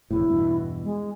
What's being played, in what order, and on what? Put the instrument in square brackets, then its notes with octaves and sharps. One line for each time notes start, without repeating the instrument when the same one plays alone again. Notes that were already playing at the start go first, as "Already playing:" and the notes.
[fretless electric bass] E1 E2 A2 [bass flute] E4
[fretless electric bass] E2 G2 B2
[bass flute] G#3